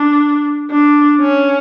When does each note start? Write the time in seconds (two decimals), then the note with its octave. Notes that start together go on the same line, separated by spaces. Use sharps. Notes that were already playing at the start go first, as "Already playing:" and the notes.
Already playing: D4
0.71 D4
1.21 C#4